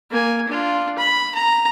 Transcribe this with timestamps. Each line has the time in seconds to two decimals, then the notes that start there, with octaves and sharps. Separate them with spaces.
0.11 A#3 G#5
0.48 D4 F4
0.98 B5
1.35 A#5